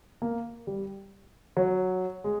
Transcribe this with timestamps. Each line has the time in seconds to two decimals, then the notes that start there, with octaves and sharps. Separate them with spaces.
0.22 A#3
0.67 G3
1.57 F#3
2.24 G#3